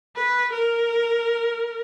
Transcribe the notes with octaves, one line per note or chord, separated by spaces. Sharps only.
B4
A#4